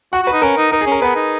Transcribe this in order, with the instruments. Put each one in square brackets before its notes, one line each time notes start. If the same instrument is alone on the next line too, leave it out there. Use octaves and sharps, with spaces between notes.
[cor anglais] F#4 [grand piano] F#5
[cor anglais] F#4
[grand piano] B4
[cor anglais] D#4
[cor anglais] C#4 [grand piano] A#4
[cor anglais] D#4
[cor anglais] D#4 [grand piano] A#4
[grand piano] G#4
[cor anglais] C#4
[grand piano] A#4
[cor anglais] B3 [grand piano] B4
[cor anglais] D#4